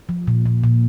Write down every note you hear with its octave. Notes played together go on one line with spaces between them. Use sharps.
F3
A#2
A#2
A#2